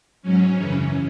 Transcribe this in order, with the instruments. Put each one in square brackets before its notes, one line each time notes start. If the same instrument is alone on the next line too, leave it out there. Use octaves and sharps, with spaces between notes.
[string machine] G#2 F#3 C#4
F#2 C#3 E3